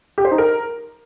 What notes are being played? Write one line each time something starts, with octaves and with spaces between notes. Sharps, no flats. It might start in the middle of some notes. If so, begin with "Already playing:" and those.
G4
C5
D#4
A#4